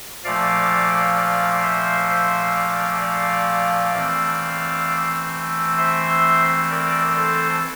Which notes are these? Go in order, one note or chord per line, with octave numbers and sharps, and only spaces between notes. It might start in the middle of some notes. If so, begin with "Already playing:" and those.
A#2 F3 A3 D5 F5
D5 F5
C5 E5
C5 E5
D5 F5
D5 F5
E3 A3 C4
C5 E5
A#4 D5
A4 C5